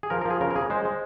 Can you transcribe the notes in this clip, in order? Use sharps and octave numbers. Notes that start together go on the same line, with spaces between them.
G#4
F3 A#4
A#4
F3 G#4
C#3 A#4
A#4
C#3 G#4
G#3 C5
G#3